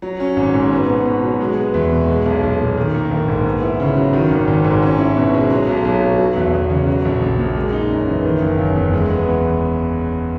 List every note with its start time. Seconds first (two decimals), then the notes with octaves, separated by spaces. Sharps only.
0.02 F#3
0.20 C#4
0.36 G#1
0.54 G#2
0.71 B3
0.89 B2
1.05 B2
1.23 F#3
1.40 G#3
1.56 B3
1.74 E2
1.92 B2
2.08 G#3
2.26 B1
2.43 B1
2.60 A#2
2.77 D#3
2.94 A#3
3.11 A#1
3.28 G#2
3.45 B3
3.63 E4
3.80 C#3
3.97 F#3
4.13 D#3
4.30 G#1
4.47 G#1
4.64 G#2
4.82 C#4
4.99 E4
5.17 B2
5.34 G#3
5.50 F#3
5.67 B1
5.85 B1
6.02 B2
6.19 F#3
6.36 E2
6.54 E2
6.70 C#3
6.87 F#3
7.05 A#1
7.22 A#1
7.38 A#2
7.56 G#3
7.73 D#4
7.90 F#2
8.08 E3
8.24 D#3
8.41 F#1
8.58 F#1
8.76 E2
8.93 G#3
9.10 B3
9.28 E2